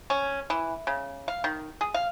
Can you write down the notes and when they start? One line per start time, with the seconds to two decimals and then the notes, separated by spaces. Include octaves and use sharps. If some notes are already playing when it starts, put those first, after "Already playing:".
0.10 C#4
0.50 E3
0.87 C#3
1.28 F5
1.44 D#3
1.81 G#4
1.94 F5